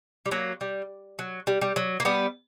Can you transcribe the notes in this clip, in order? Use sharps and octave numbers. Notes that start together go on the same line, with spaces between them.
G3
F#3 A#3
G3
F#3
G3
G3
F#3
A#3
G3 B3